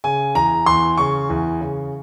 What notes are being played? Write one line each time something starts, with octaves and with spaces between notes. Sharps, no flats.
C#3 G#5
E2 A#5
E2 C6
C#3 C#6
E2
C#3